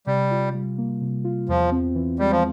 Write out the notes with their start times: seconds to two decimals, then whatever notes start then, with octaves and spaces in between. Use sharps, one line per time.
0.07 C3 G3
0.31 F4
0.54 G3
0.78 A#3
1.01 C3
1.24 F4
1.48 E2 F3
1.72 C4
1.95 E3
2.19 G3 G#3
2.31 F3